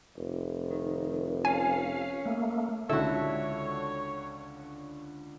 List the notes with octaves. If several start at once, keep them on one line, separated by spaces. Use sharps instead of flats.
F1
D#3
C#4 F5 G#5
A3 A#3
C#2 D3 E4 F#4 A4 C#5 E6